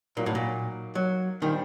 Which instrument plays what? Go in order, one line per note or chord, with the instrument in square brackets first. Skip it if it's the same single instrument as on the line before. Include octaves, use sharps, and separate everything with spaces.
[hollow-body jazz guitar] A#2 [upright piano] F#3 A#3 D#4 F#4 A#4
[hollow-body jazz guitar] A2
A#2
F#3
[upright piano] A#2 G3 D4 G4 C5 [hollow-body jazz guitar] D#3